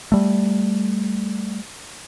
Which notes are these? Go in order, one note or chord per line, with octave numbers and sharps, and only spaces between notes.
G3 A3